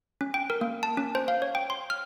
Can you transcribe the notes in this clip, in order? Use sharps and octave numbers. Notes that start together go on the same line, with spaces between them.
C#4
G5
A#4
A#3
A5
C#4
C5
F5
C#5
G5
C6
F6